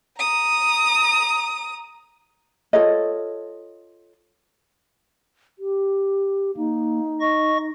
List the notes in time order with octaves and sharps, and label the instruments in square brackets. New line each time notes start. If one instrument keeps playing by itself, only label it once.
[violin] A#5 D#6
[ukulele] F4 A4 C#5 D#5
[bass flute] G4
[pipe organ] A#3 [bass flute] D#4
[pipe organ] D#5 C#6 A#6